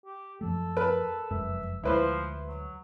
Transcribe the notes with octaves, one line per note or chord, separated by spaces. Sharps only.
G4
F#2 F3 A3 A4
A#4 B4 A5
F1 F#2 G#3 E5
D2 F3 G#3 E4 B4 C5
F#3